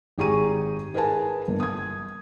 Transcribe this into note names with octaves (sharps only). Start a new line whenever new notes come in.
G#1 G4 G#4 A#5 C#6 D#7
G#4 A#4 B4 G#5 A5
G1 A#3
D#6 G#6